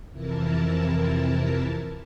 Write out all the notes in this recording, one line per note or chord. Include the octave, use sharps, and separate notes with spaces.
F2 C3 E3 E4 A#4 A5